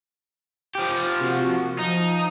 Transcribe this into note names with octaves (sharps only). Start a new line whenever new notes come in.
F3 G4
C3 A#3 F#4
F3 D#4